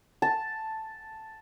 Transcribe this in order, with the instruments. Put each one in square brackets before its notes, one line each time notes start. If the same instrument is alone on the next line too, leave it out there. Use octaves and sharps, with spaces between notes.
[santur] A5